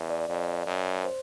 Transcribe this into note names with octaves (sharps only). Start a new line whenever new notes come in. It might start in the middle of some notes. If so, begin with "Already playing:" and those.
Already playing: E2
D5
F2
F#2
C5